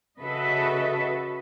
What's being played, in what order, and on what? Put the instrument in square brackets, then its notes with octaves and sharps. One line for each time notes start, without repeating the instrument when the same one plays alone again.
[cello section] C#3 F#4 A4 B4 D#5 E5